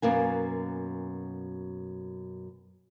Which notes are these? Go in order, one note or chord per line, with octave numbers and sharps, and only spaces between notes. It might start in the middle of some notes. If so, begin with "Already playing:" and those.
F#2 B2 A#3 G#5